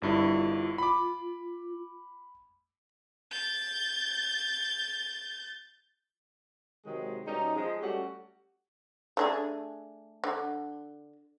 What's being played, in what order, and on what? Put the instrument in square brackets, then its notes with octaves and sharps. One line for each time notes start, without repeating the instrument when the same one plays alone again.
[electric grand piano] G1 G2 E4 [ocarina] F4
[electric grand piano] B5 D6
[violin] G6 A6
[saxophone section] C3 D#3 F#3 G#3
B2 G3 C#4 D#4
F3 G#3
G3 A3 C#4 F#4 G4
[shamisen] A3 D4 G#4
D3